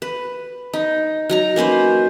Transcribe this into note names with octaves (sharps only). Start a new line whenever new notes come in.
B4
D#4
F#3 D#4 A#5
A#3 C#4 B4 C5